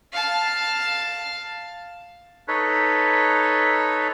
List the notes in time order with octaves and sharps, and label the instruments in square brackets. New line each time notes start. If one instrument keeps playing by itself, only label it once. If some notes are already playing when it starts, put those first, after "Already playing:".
[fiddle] F5 A5
[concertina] D#4 A4 B4 C#5